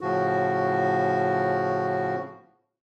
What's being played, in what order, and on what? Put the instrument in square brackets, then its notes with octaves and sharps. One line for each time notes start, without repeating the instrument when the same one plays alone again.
[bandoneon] A2 C#3 F3 F#4